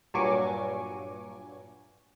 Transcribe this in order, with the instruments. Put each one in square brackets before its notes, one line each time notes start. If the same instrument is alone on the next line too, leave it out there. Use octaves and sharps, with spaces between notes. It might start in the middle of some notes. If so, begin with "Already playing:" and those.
[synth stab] G2 A#2 F#3 G#5 C#6 D6